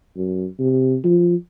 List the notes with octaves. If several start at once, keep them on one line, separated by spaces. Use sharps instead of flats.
F#2
C3
F3